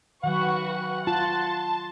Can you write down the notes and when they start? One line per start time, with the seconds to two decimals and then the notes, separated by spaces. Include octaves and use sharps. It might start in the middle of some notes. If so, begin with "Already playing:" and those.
0.24 D#3 F#3 F#4 B4 F#5 C#6
1.07 F4 A5 C6 A6